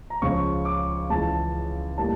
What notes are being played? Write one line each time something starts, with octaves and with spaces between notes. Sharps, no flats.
A#5
C#2 C#3 F3 C#4 C#6
D6
C#2 C#3 E3 A5
A2 G3 A#3 A5